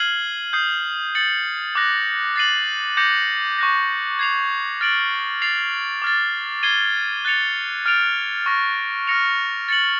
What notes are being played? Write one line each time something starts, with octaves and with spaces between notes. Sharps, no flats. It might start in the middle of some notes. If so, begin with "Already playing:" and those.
Already playing: F6 G#6 C7 D#7 F#7
D#6 G6 C7
A6 C#7 F#7
D6 F#6 A#6
A6 C7 D#7 F#7
D6 G6 A#6 C#7
C#6 F#6 A#6
G#6 C7 F7
F6 A6 D7 F#7
A6 C7 F7
D6 F6 A6
G#6 C7 D#7 G7
F#6 A6 C#7 F7
F6 A6 D7 F7
C#6 F6 A#6
F6 A#6 C#7 F7
A6 C#7 F#7